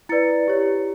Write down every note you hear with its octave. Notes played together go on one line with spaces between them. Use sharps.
E4 B4 D5 A6 C#7
E4 G4 C#5